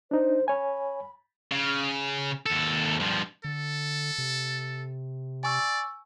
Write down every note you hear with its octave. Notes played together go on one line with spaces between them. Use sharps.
D4 D#4 C5
C#5 G#5 B5
C#3
D#2 A4
G2 F3
D3 A4
C3
D5 G#5 C#6 E6